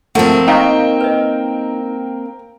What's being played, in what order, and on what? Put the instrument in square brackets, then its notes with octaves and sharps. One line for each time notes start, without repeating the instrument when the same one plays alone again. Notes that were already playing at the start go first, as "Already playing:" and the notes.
[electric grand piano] F3 A3 [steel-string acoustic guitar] A#3 C4 [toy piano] F#5
[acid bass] D#4 [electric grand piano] A#4 G5 [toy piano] D#5 F5 C#6
[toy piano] B4 D#5